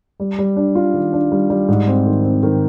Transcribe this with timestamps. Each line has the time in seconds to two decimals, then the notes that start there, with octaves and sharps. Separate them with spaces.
0.20 G3
0.38 G3
0.56 D4
0.75 F4
0.94 D#3
1.13 D4
1.32 G3
1.50 G3
1.68 G#2
1.88 C4
2.06 D#3
2.25 C4
2.43 D#3